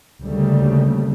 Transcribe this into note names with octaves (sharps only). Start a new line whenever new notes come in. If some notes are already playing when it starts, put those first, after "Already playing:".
D2 C#3 G3 A3 A#3